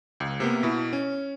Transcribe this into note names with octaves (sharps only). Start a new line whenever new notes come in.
C#2
C3 A#3 B3
B2 E4
C#4